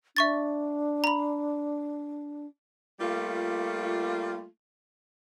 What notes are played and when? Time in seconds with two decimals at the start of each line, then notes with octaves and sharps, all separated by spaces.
0.17 D4 E5 C#6 A6
1.04 A#5 B5
3.00 G3 A3 A#3 F4